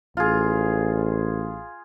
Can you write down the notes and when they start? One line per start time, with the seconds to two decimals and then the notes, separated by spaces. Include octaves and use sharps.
0.17 A1 F4 G#4